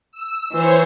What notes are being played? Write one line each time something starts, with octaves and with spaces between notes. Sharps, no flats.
E6
E3 C5 C#5